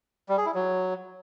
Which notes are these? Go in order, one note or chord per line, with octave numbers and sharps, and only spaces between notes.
G3
G#4
E4
F#3